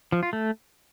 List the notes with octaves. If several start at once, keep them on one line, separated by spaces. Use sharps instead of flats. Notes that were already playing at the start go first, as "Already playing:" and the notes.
F3
F4
A3